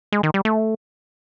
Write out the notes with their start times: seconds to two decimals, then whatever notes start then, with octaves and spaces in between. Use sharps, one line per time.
0.12 G#3
0.23 D#3
0.34 G3
0.45 A3